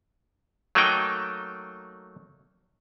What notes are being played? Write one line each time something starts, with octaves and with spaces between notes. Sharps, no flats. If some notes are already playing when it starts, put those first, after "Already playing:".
F#3 A3 A#3 D#4 G5